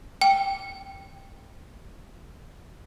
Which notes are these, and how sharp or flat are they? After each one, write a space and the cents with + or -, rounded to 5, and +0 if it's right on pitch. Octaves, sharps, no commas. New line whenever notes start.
G5 +0